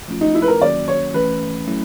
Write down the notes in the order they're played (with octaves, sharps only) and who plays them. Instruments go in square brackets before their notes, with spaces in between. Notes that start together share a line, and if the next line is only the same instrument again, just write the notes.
[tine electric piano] F3 A3 C#4 F4
[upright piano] D#4
E4
B4
A#4
[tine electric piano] D#3 F#3 A#3 C#4 F#4 [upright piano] D5
[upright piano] C#5
[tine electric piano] E3 A3 C#4 [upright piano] B4
[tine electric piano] F#3 A3 C#4 E4